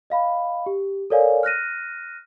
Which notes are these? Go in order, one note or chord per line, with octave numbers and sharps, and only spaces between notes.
D#5 F5 B5
G4
A4 A#4 C#5 D5 F5 G#5
F6 F#6 A#6 D#7